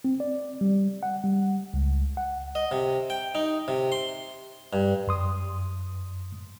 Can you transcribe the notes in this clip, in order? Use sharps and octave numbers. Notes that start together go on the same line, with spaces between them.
C4
D5
G3
F#5
G3
C#2
F#5
D#5
C3
G5
D#4
C3
C6
G2
F#2 C6 D#6